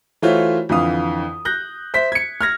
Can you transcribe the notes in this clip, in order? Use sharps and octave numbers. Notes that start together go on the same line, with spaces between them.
E3 A3 F4 F#4 C5 C#5
F2 D3 E3 F5 D#6
F#6 G6 A#6
C5 E5 B6
G#6 C#7
F6 G#6 A#6